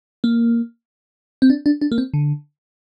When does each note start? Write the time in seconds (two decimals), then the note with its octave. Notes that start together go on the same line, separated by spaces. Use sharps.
0.24 A#3
1.42 C4
1.50 D4
1.66 D4
1.81 D4
1.92 A#3
1.98 C4
2.14 D3